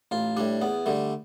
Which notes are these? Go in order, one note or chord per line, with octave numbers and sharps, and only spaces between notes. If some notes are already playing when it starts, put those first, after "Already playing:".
A1 F4
A2 G3 D4
E2 B3
D3 G3 A3